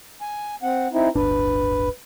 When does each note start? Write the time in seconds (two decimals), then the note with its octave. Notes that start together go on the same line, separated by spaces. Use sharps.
0.21 G#5
0.62 C4 F#5
0.93 C4 D#4 E4
1.15 D1 G1 D4 B4